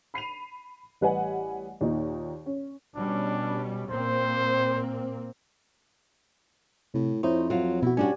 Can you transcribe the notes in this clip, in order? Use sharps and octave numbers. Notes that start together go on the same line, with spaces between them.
B5 C7 D#7 F7
A1 G3 B4 D#5 F#5 G#5
D#2 A#2 D#4
C#4
B2 G3 C#4 D4
A#2 A#3 C4 C5
A2 C3
F2 D#4 E4 C5 C#5
F#3 F4
B2 E4 F#4
G2 C#4 D4 F#4 G4 D5 G#5